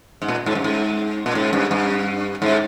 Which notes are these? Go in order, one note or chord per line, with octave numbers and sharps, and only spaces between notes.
G#2
A#2
G#2
G2
G#2
A#2
G#2
G2
G2
G#2